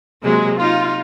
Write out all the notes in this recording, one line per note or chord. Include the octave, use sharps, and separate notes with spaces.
C3 F#3 G#3 A#3
D#4 F4